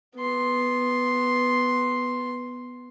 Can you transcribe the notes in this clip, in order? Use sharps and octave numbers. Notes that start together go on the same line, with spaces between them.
B3 C6